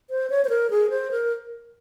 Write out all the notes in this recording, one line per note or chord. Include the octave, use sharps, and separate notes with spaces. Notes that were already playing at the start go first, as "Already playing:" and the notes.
C5
C#5
C5
A#4
G#4
C5
A#4